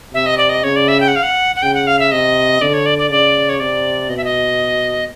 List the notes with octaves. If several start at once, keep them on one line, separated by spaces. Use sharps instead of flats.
C3 E5
D#5
D5
D#5
C#3 C#5
D5
E5
G5
F#5
F5
F#5
F#5
C#3 G5
F#5
F5
E5
C3 D#5
D3 D5
C#5
D5
D5
C#3 D5
C#5
C3 D5
B2 D#5
E5
D#5